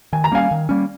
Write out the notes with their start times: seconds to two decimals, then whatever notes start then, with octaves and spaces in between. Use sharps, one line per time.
0.13 D#3 G#5
0.24 A#5
0.32 G3 A#3 C#4 F5 G#5
0.51 D#3
0.69 G3 A#3 C#4